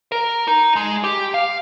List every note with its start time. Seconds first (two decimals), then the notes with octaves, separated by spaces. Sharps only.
0.12 A#4
0.47 D#4
0.76 G#3
1.04 G4
1.34 F5